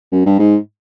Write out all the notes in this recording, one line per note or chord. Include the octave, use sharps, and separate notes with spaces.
F#2
G2
G#2